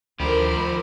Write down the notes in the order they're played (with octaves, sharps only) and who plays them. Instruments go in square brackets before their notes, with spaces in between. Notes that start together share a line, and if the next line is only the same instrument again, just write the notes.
[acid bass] D2 [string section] D#3 A#4 [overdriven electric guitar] F3 G4 [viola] C5 B5